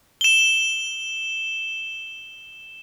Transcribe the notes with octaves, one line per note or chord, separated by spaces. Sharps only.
E7 G7